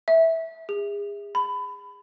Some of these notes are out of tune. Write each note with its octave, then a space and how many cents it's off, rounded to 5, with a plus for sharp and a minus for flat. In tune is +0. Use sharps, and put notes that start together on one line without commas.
E5 -10
G#4 -35
B5 +25